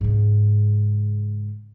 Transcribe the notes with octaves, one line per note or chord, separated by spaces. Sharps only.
G#2 C#3